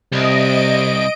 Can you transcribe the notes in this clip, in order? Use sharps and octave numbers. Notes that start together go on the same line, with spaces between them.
C2 C3 D#5 D7